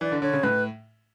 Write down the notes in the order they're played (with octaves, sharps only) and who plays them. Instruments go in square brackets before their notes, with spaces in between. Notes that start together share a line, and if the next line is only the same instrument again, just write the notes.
[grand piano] E3 [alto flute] D5
[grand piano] D3
[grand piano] D3 [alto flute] C#5
[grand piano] C#3
[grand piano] A2 [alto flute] B4